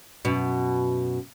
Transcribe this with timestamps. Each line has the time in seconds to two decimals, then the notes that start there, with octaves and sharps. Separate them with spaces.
0.25 F#2 B2